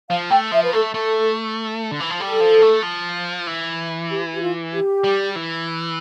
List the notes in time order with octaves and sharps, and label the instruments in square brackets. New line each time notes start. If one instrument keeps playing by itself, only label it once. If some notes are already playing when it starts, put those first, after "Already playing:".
[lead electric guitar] F3 [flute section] F5
[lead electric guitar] A3 [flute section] G5
[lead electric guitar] F3 [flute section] E5
[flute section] B4
[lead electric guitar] A3 [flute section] A4
[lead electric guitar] A3 [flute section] A4
[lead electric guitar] D3
E3
F3
[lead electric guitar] G3 [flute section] A4
[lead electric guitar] F3
A3
F3
E3
[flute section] G4
G4
F4
G4
[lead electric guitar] G3
E3